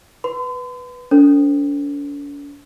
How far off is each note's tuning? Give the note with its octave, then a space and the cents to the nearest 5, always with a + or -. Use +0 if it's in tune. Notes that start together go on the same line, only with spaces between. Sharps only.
B4 +0 C6 -45
D4 -45 A4 +40 C5 +0